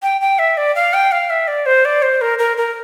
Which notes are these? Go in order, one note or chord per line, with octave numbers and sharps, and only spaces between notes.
G5
G5
E5
D5
F5
G5
F5
E5
D5
C5
D5
C5
A#4
A#4
A#4